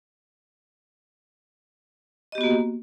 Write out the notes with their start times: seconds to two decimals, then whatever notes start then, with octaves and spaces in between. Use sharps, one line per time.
2.32 D#5
2.35 G4
2.38 B3
2.41 F#4
2.44 A#3